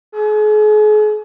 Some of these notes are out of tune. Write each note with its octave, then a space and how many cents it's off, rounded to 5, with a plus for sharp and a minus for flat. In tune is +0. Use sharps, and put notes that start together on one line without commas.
G#4 +40